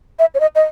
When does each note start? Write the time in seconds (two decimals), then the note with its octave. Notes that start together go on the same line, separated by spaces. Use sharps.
0.19 E5
0.34 C#5
0.40 D#5
0.55 D#5